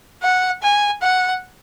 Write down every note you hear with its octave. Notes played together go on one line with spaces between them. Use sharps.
F#5
G#5
F#5